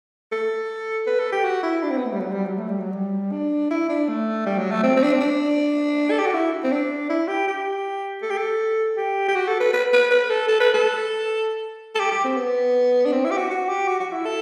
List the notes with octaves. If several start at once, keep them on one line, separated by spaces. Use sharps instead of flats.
A4
B4
A4
G4
F#4
E4
D4
C4
B3
A3
G3
F#3
G3
F#3
A3
G3
F#3
G3
D4
E4
D4
A3
G3
F#3
A3
C4
C4
D4
C4
D4
A4
G4
F#4
E4
C4
D4
E4
G4
G4
A4
G4
A4
G4
G4
F#4
A4
B4
B4
B4
B4
A4
A4
B4
A4
A4
G4
G4
C4
B3
D4
C4
E4
G4
F#4
F#4
G4
F#4
F#4
E4
A4